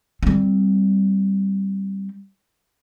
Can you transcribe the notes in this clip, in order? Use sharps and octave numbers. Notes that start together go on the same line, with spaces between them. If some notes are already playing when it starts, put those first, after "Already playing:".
G3 C4